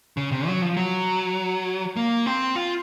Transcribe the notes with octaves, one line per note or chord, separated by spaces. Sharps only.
C#3
C3
F#3
F3
F#3
A#3
C4
F4